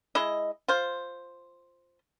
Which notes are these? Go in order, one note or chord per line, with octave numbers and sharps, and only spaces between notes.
G#3 E4 D#5
F4 C5